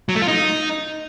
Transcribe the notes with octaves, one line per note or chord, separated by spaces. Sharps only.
F#3
A3
F4
D#4